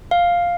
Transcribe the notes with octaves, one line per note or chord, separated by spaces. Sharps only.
F5